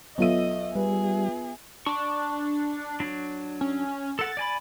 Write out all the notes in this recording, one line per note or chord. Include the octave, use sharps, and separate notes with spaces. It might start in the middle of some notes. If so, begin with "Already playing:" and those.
B1 B3 F4 A4 D#5 E5 D#7
G3 G#4 B4
D4 C#6
F#3 D4
C#4
A4 F#5 A6
D5 G#5 B5